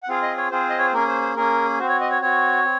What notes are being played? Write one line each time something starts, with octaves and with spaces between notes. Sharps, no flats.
F#5
C4 F4 G#4 F5
D#5
C#5
C4 F4 G#4 C5
D#5
C#5
C5
A#3 C#4 G#4 A#4
C5
C5
A#3 C#4 G#4 A#4
C4 F#4 C5
C#5
D#5
C#5
C4 F#4 C#5
C4